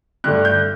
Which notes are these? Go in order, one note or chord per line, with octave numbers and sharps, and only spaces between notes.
G2 D3 A3 F#6
G6